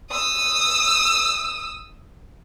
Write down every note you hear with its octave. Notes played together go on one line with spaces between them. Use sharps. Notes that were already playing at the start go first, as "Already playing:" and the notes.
D#6 E6